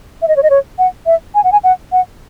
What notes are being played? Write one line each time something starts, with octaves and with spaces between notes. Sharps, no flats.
E5
D#5
C#5
D#5
C#5
F#5
E5
G#5
F#5
G#5
F#5
F#5